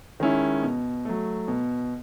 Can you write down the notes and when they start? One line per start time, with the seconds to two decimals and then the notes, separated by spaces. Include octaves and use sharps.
0.20 D#3 G#3 C#4 E4
0.63 B2
1.05 F#3 A3
1.48 B2